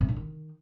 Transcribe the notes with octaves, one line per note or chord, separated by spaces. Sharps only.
C3
D4
D#3